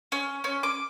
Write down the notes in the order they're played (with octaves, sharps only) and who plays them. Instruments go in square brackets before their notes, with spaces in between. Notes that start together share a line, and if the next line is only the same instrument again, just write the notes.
[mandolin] C#4
C#4
D6